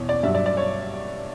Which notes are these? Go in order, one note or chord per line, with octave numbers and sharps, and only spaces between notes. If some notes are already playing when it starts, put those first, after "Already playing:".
Already playing: E2 B2 C#5
D5
G2 F#3 E5
D5
D5
C#5